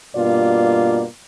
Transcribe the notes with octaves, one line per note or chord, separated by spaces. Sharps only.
G2 B2 A#3 F4 D5